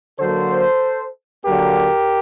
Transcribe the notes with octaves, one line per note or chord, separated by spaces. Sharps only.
D3 F#3 A#3 A4 C5
D3 F#3 A#3 G4 A#4